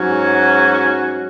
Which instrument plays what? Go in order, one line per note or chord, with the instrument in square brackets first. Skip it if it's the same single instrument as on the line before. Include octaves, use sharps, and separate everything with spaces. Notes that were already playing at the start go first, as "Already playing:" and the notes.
Already playing: [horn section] G#2 F#3 C#4 F#4